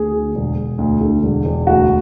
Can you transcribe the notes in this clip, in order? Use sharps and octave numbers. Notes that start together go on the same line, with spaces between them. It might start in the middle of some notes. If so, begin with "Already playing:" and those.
Already playing: D2 G#4
D3
E1
E1
D2
D3
E1
E1
D2 F#4